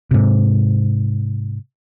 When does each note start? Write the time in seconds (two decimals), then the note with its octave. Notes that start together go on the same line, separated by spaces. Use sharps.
0.11 G#2 C3